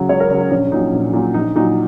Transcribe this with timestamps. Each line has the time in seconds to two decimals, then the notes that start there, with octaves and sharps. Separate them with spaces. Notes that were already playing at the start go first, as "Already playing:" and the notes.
Already playing: C#3 F#3 G#4
0.09 C#2 C#5
0.20 A#4
0.30 C#3 F#3 C#4
0.41 C#4
0.51 A#1 C#4
0.72 A#2 F#3 D#4
0.93 A#1
1.13 A#2 F#3
1.34 A#1 D#4
1.55 A#2 F#3 D#4